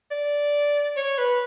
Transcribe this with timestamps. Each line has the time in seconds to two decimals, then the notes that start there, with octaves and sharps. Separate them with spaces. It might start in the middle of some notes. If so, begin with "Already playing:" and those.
0.11 D5
0.97 C#5
1.18 B4